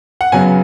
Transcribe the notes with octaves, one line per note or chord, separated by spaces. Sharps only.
F#5
F#2 C#3 F#3 B3 G#5